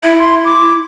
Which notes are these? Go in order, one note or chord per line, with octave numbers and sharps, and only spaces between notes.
E4 E5
C6
D6